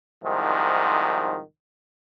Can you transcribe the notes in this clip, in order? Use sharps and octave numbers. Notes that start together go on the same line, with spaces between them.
C2 G#2 D#3 F3